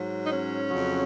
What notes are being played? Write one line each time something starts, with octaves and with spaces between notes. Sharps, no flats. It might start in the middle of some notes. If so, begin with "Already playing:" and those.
Already playing: G#2 F#3
D#4
C#4
F2 C#3 F#3